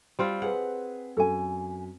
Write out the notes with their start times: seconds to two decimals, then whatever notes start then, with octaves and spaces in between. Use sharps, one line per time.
0.19 G3 C4 F4
0.42 G#4 B4 F#5
1.17 F#2 A4 G#5